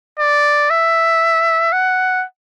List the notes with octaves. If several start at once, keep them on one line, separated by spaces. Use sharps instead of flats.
D5
E5
F#5